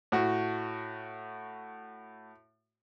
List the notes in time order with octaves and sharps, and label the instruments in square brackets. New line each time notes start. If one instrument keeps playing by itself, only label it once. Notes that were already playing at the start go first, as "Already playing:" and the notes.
[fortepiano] A2 F#4